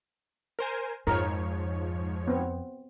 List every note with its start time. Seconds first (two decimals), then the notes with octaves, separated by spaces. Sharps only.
0.59 A#4 C5 G#5
1.07 F2 G#2 F3 A#4 C#5
2.27 B3 C4